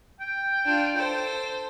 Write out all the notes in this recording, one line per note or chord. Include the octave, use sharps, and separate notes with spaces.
G5
D4 F4
A4 C5